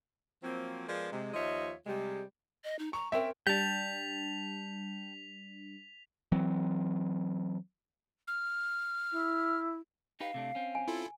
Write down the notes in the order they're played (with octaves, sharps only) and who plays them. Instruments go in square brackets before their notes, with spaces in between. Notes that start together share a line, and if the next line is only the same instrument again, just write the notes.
[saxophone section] F3 F#3 A#3 C4
F3 G#3 B3 F4 A#4 D5
C3 G#3
D#2 F3 F4 C#5 D#5 E5
C3 G3 G#3
[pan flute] D#5
D#4
[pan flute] A#5 [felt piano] C#6
[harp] C4 C#4 A#4 [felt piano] E5 [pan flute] G5
[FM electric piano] G3 D4 [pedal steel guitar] G5 A5 [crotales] B6 F7
[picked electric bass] E3 F#3 C4
[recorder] F6
[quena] E4
[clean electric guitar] D#4 G4 B4 [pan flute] F5
[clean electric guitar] C3 A3 D4
C4 C#4
[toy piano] G#5
[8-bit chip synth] E4 F4 A4